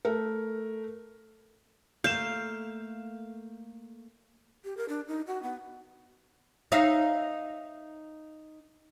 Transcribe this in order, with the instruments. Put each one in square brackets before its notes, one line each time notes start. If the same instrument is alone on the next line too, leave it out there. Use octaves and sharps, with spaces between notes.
[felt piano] A3 A#4
[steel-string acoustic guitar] A3 A#3 [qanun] F5 [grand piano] G6 E7
[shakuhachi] G4
A#4
D4
D#4
F#4
B3
[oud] D#4 E5 F5